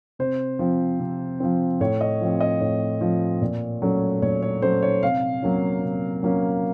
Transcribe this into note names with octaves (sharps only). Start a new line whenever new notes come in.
C3 C5
F3 C4
C3
F3 C4
A2 C#5
D#5
F3 C4
D#5
A2 C#5
F3 C4
A#2
F#3 A3 C#4
A#2 C#5
C#5
F#3 A3 C#4 C5
C#5
C3 F5
F#3 A#3 C#4
C3
F#3 A#3 C#4